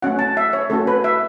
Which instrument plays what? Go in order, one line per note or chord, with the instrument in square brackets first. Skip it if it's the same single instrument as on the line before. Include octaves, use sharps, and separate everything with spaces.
[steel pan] A3 C#4 F#4 F#5
A5
E5
C#5
A3 C#4 F#4 A4
B4
E5